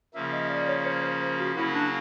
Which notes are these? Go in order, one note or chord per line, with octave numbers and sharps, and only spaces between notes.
C#3 F3 A#3 E5
D#5
D5
C#5
C5
C5
F#4
C#3 F#3 A#3 C#4 E4 F#4
D4